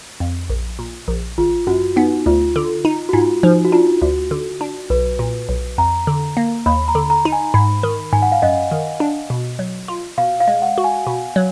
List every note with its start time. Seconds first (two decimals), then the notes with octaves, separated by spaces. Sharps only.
0.20 F2
0.50 A#1
0.79 A#2
1.08 A#1
1.38 G#1 F4
1.67 F#2 F#4
1.96 B3 D#4
2.26 D2 F4
2.56 D3
2.85 D#4
3.09 F#4
3.13 G#2 F4
3.43 F3 D#4
3.65 F#4
3.72 D4 F4
4.01 D2 F#4
4.31 D3
4.61 D4
4.90 B1 B4
5.19 A#2
5.49 B1
5.78 F2 A#5
6.07 D3
6.37 A#3
6.66 D#2 B5
6.88 A#5
6.95 D3
7.10 A#5
7.25 D#4
7.32 G#5
7.54 G#2 B5
7.83 D#3
8.13 G#2 G#5
8.22 F#5
8.32 F5
8.42 F#2 D#5
8.71 D#3
9.00 D4
9.30 B2
9.59 F#3
9.88 F4
10.18 B2 F5
10.40 F5
10.48 G#3
10.62 F#5
10.78 F#4
10.84 G#5
11.07 B2
11.36 F#3